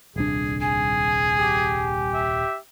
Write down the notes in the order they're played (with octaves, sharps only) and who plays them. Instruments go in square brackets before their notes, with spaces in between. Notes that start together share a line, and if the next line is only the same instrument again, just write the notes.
[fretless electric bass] D#1 C2 D4 [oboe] G#4
[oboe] G#4 [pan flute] G#5
[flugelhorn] G4
[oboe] E5